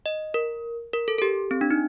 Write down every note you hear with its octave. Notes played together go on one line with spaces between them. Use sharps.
D#5
A#4
A#4
A4
A4
G4
C4
D4
D#4